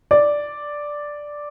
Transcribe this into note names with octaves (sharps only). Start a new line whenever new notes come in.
D5